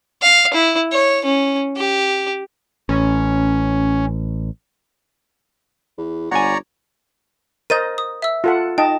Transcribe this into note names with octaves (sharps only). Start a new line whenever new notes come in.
F5
E4
C#5
C#4
G4
A1 C#4
E2
G1 C#5 D5 F#5 G#5 A#5
A#4 C5 D#5 G6 A6 D#7
D#6
E5 E6
F4 A4 F#5
D#4 D#5 G5 A5